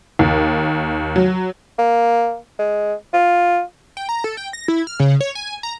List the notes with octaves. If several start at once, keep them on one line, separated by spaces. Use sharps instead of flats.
D#2
F#3
A#3
G#3
F4
G5
A#5
A4
G5
A#6
E4
F6
C#3
C#5
G#5
A#5